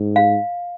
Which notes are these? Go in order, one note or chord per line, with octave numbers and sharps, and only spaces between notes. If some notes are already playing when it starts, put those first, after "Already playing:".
Already playing: G#2
F5